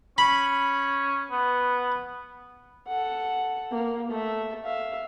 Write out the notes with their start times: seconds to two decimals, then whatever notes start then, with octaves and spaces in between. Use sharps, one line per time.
0.18 C#4 B5
1.31 B3
2.87 A4 F#5
3.71 A#3
4.11 A3 E5
4.65 E5 F5